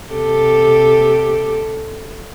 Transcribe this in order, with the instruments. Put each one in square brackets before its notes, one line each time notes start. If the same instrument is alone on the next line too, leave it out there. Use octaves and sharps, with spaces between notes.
[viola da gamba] C3 G4 A4